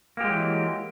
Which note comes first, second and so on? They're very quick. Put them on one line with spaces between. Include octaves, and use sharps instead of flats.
A#3 G4 G#3 F#3 E3